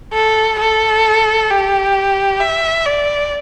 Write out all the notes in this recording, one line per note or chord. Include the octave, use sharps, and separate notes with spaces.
A4
A4
G4
E5
D5